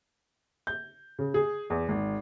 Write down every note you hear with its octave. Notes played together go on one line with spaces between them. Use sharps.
G6
C#3
G#4
E2
G#1